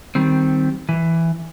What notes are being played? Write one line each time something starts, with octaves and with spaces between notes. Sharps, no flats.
D#3 G3 C4
E3